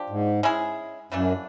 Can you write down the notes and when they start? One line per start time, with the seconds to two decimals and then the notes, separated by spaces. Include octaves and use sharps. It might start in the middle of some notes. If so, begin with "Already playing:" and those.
Already playing: F3 D4 G4
0.10 G#2
0.43 G#3 C#4 E4 G#4
1.12 F#2 C#3 E3 A3 D4